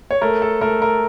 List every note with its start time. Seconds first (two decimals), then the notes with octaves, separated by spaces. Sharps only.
0.11 C#5
0.21 A3 A#4
0.42 A4
0.61 A3 A#4
0.82 A#4